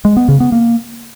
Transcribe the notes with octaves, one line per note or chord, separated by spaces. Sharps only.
G#3
B3
C#3
B3
A#3